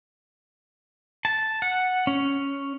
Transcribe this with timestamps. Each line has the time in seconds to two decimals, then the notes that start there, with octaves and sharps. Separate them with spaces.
1.25 A5
1.62 F#5
2.07 C#4